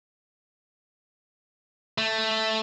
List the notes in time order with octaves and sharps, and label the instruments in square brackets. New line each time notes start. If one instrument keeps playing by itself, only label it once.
[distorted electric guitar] A3